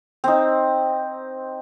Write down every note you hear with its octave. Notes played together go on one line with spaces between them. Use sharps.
C4 D#4